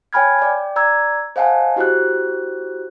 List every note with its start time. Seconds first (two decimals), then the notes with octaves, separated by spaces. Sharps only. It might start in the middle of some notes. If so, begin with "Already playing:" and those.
0.13 C#5 G5 G#5 B5 F6 G#6
0.39 D5 G5
0.76 D5 A#5 E6 G#6
1.36 C5 D#5 F5 F#5 G#5 A5
1.76 E4 F#4 G4 C5 F#6